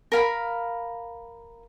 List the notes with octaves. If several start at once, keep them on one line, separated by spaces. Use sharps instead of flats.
A#4 F5 B5